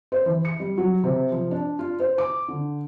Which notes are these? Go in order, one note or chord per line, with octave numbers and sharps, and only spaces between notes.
C5
E3
C#7
G3
F#3
C3
F3
D4
F4
C5
D6
D3